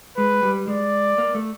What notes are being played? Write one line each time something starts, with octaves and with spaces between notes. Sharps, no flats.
G#3 B4
G3
G#3 D5
A#3
A3